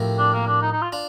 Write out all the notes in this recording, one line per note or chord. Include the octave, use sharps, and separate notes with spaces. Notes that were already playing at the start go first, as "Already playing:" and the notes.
Already playing: A2 F3 C4 G4 A#4
D4
A#3
D4
D#4
D#4
F4
D4 F4